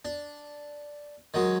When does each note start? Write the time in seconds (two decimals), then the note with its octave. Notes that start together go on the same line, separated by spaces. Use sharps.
0.05 D4
1.34 D#3 F#3 G#3